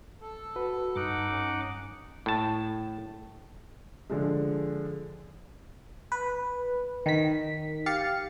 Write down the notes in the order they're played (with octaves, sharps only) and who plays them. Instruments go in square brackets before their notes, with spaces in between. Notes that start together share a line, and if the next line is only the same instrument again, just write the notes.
[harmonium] A4
[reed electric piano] F#4 B4
[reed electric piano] G2 [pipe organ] D#4 F#5 D6
[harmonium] C#4
[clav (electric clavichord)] A2 A5
[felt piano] D3 F3 G#3
[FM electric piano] B4
D#3 B6
G4 F5 A6 C#7